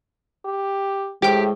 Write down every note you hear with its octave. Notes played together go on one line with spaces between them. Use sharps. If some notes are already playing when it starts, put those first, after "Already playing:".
G4
A2 G#3 G4 C5 G5